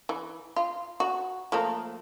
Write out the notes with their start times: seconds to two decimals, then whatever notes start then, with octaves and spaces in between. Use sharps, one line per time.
0.09 E3
0.56 F4
1.00 F#4
1.52 F3 A3 A#3